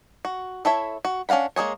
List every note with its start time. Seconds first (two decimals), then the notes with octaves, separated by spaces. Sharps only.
0.25 F#4
0.65 E4 A4 C#5 E5
1.05 F#4
1.29 C#4 D4 F5 F#5 B5
1.56 G#3 A#3 G#4 C#5